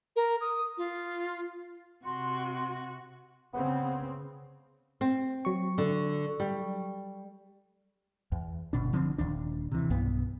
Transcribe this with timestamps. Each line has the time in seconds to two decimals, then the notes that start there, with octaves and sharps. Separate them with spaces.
0.16 A#4
0.41 D#6
0.77 F4
2.05 C3 F#4 C6
3.53 C#3 B3 C4
5.01 C4
5.45 F#3 C#6
5.78 D3
6.40 G3
8.32 E2
8.73 G1 B2 D4
8.93 D3 F3 C4 D4
9.18 D#1 D#2 D4
9.72 C3 E3
9.90 B1 G2 B3